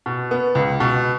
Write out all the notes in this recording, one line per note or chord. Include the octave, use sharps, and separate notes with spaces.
B2
B3
C#2
B2